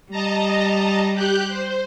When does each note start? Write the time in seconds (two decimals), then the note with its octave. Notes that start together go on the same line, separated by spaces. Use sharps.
0.10 G3 D#5 A5 A#5
1.13 G4 F#6 G6
1.48 C5